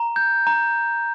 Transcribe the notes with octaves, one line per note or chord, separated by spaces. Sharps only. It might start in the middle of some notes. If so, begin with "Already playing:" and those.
Already playing: A#5
G6
A#5